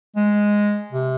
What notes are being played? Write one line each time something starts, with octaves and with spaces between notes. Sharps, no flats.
G#3
C3